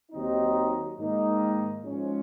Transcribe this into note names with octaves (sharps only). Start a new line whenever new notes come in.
D#2 D#3 F#3 C4 D#4
G#2 D#3 A#3 D#4
G#2 F3 G#3 C#4